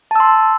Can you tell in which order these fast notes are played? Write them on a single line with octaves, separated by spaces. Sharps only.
A5 E6 C6